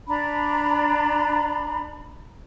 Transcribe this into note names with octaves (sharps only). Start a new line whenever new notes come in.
D4 A#5 B5